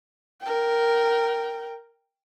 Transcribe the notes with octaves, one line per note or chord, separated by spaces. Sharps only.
A#4 G5